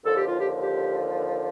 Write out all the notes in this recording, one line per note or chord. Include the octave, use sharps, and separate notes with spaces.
D#2 D3 F3 A4
G4
F4
G4
G4